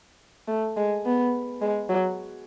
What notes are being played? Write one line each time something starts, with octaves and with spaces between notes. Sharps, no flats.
A3
G#3
B3
G#3
F#3